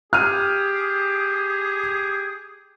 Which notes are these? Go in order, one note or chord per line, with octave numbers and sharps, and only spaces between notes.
G4 G#4 F6 D#7